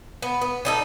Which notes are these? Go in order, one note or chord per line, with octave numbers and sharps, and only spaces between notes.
B3
B3
G3 D#4 A4